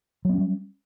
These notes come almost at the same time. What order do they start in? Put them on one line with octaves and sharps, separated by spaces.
F#3 B3 C#4 G3